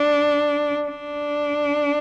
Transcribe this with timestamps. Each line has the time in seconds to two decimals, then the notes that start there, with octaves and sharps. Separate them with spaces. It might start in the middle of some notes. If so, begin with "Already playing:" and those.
Already playing: D4
0.88 D4